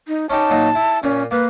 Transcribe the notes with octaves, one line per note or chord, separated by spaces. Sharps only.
D#4
C#4 D#4 G4 A5
A#2 F#3 D#4
E4
A#2 C#4
A#3 B4